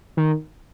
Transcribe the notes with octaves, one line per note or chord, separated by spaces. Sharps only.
D#3